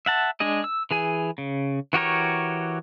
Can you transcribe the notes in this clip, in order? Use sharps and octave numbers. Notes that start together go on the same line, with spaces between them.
E5 F#5 A5
G#3 D4 G#4 D#5
E6
E3 G#4 G#5
C#3
E3 F#4 G4 A#4 C#5